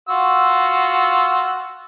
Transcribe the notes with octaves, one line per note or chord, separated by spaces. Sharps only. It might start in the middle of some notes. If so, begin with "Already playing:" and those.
F4 F#4 E6